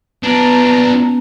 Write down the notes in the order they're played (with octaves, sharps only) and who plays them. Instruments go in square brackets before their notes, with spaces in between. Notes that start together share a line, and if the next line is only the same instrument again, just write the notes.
[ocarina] B3 [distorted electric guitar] D4 F4 [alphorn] B4 [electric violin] A5 A#5